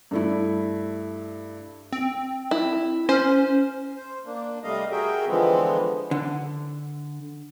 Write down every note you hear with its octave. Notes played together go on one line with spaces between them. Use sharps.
G2 A3 E4
C4
E4
C#4 C5
C5
A#3 D4
C3 G3 A3 D#5 F5
F#4 G#4 A#4 E5 G5
D3 E3 F3 G#3 B3 C4
D3